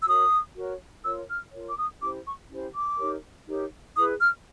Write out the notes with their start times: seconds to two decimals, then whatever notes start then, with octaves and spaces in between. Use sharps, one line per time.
0.02 E6
0.06 F#4 A#4 C#5 D#6
0.56 F#4 A#4 C#5
1.04 F4 A#4 C#5 E6
1.28 F6
1.52 F4 A#4 C#5
1.67 D6
1.77 D#6
2.01 C#4 E4 G4 C5 D6
2.25 C#6
2.50 C#4 E4 G4 C5
2.74 D6
2.98 D#4 G4 A#4 C#5
3.47 D#4 G4 A#4 C#5
3.95 E4 G#4 B4 D#6
4.20 F6